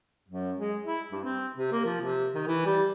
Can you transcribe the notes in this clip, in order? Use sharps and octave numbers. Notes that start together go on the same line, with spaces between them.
F#2
G#3
E4
G2
C4
C3
A#3
F3
C3
D#3
E3
G3